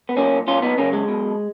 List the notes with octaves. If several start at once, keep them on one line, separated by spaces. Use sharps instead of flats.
B3
B1 A#2 A#3 C#4
B1 A#2 C#4 F4
B3 D#4
F#2 C#3 A#3 C#4
G#3
B1 B2